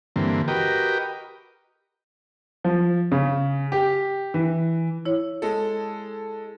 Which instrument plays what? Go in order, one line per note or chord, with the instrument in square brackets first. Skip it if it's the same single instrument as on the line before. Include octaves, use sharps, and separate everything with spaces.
[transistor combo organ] G2 D3 E3 A#3 C4
F#4 G4 A#4 B4 D#5 G5
[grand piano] F3
C#3
G4
E3
[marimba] E4 C#5
[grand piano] G#3 A4